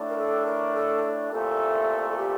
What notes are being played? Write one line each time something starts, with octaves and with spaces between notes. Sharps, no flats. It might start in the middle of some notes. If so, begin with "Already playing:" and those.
Already playing: A2 A3 D4
A#4
A4
A#4
A4
C2 A#2 A3 A4
A4
G4